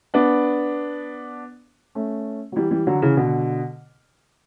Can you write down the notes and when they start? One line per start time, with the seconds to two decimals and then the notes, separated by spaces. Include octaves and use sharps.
0.14 B3 D4
1.95 A3 C#4
2.52 F#3
2.56 E3 G3
2.71 E3 G3
2.87 D3 F#3
3.02 C#3 E3
3.17 B2 D3